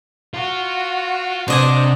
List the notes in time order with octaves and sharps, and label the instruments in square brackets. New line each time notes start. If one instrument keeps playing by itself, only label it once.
[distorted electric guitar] F4 [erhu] F#4
[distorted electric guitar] C3 [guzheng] D4 D#5 G#5 [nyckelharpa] C5 D5